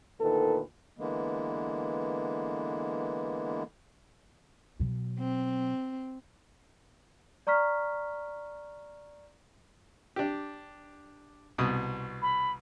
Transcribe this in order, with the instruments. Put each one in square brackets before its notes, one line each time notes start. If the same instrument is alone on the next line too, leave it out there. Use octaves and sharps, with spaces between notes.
[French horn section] D2 A#2 D#3 A4 B4
[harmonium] D3 E3 G#3 A#3 B3
[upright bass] B2 F#3
[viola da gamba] C4
[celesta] D5 A#5 C#6 F6 B6
[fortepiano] D4 G4
C2 B2 D#6
[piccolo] B5